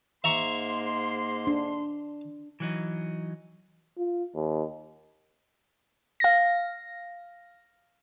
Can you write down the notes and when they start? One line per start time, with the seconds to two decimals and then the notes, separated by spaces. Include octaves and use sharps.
0.24 G#2 A#3 E5 A#5 C6 C#6
1.47 D4
2.60 E3 F#3 D#4
3.98 F4
4.35 D#2
6.20 F5 A#6